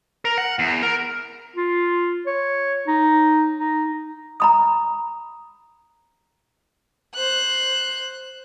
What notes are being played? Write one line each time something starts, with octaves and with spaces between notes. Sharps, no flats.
A#4
F#5
E2
A#4
F4
C#5
D#4
D#4
A#5 B5 D#6
C5 F#6